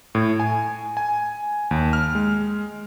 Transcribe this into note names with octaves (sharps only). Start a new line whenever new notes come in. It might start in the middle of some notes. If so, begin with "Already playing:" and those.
A2
G#5
G#5
D#2
F6
G#3